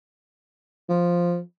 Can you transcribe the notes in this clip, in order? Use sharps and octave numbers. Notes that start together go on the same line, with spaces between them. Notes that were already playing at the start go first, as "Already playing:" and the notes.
F3